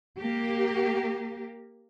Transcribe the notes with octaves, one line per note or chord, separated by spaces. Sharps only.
A#3 G4